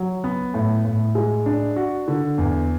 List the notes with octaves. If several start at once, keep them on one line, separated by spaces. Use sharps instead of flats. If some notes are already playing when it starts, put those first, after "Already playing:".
Already playing: F#3
B3
A2
A2
G#3
D4
F#4
D3
E2